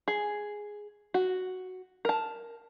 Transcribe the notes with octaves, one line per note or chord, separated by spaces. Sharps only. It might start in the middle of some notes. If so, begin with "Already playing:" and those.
G#4
F#4
A#4 A5